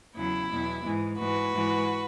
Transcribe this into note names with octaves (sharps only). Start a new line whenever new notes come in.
E2 C#3 F#3 E4
E2 B2 F#3
G#2 E3 G#3
G#2 E3 G#3 F#4 B4
G#2 E3 G#3